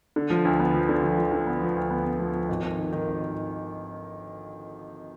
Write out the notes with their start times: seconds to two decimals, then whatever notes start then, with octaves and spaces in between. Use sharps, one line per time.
0.16 D3
0.30 F3
0.45 D2
0.59 B3
0.74 F3
0.89 D3
1.03 F3
1.18 F3
1.32 D3
1.47 B3
1.62 F3
1.76 D2
1.90 B3
2.05 B3
2.20 F3
2.34 F3
2.49 G#1
2.63 G#1
2.77 D#3
2.92 D#3
3.07 G#1